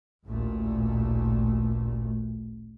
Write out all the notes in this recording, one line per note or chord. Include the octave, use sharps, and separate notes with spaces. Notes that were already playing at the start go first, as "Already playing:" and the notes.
A1 D2 A#2 A3